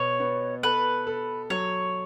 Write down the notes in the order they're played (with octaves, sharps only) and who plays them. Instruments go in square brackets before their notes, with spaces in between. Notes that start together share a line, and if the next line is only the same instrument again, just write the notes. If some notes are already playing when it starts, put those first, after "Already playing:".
Already playing: [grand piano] B2 B3 [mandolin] C#5
[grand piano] B3
[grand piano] A4 [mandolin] B4
[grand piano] A4
[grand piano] F#3 [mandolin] C#5